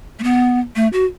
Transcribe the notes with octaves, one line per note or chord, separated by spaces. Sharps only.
A3
B3
A3
F#4